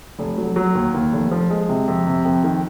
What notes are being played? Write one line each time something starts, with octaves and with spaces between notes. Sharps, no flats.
F1
F#3
F#3
D#2
D#2
F1
F3
G#3
C3
F2
C3
F2
D#3